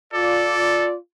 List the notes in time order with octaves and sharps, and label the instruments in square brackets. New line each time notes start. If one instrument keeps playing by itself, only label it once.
[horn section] F4 D5 [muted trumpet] A4